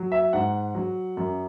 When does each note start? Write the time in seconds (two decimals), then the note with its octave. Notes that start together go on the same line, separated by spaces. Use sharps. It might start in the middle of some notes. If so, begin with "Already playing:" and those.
Already playing: F#3
0.12 E5
0.33 G#2 F#5
0.75 F#3
1.17 F#2